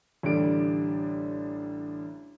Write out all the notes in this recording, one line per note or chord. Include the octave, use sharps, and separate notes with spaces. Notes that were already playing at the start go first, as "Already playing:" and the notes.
A1 D3 G3 D4 D7